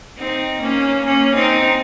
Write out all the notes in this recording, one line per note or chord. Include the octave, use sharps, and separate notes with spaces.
C4 D#4
A#3 C#4
A#3 C#4
C4 D#4